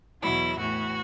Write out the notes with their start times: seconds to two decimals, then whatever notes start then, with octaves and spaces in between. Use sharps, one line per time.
0.22 E2 B2 F#3 E4
0.59 A2 E3 F#4